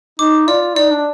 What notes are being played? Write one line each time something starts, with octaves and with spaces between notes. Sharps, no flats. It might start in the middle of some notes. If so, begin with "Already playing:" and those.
D#4 D6
F4 D5
D#4 D5
D4